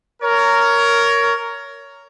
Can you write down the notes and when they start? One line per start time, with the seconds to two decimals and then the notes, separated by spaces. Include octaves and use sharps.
0.23 A#4 C#5